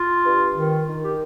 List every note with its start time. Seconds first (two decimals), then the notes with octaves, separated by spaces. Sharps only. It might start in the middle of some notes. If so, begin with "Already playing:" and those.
Already playing: F4
0.25 G2
0.56 D#3
0.87 D#3
1.04 G4